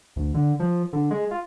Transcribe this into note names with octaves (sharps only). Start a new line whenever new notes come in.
D2
D3
F3
D3
G#3
F4